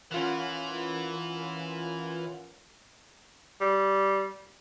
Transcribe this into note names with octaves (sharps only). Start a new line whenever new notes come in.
E3 C#4 F4 A#4 F#5
G3